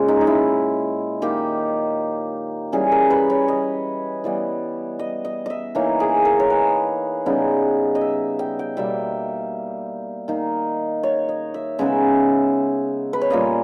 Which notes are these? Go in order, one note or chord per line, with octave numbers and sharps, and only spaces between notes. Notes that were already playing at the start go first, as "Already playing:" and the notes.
Already playing: A#2 G#3 C#4
D#4
D#4
E4
D#3 A#3 D#4 G4
E3 G3 C#4 G#4
A#4
B4
C#5
D#5
E3 G3 B3
D#5
D#5
D#5 E5
E3 A#3 D#4 C#5
G#4
A#4
C#5
B4
C#3 G3 B3 D#4
D#5
E5
G5
G5
B2 G3 A#3 E5
D#3 A#3 D#4
C#5
D#5
E5
C#3 G#3 B3 D#4 E5
B4
C#5
A#2 G3 A#3 C#4 D#5